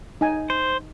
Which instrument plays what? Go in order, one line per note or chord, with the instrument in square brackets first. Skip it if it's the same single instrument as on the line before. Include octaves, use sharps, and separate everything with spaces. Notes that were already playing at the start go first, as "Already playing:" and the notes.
[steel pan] D#4 G#5
[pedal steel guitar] C5